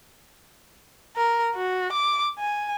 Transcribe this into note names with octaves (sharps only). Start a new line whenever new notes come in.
A#4
F#4
D6
G#5